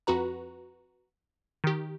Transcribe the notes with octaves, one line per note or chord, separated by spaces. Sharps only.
F2 F#4 B4 A#5
D#3 G4